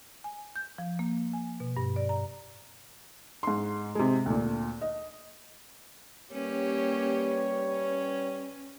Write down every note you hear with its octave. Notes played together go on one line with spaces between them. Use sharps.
G#5
G6
F3
A#3
G#5
B2
G2
D5
A#5
G#2 C6
C3 G#3
D2 A#2
D#5
G3 A#3 C#4 G4 B4 C#5
C#4